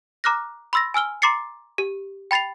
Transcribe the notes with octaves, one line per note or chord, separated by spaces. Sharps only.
A#5 D6 F6 F#6 A#6
B5 C6 E6 A6 A#6
G#5 E6 F6 G7
A#5 C6 D6 A6 C7 C#7
G4
G5 B5 A6 C7 F7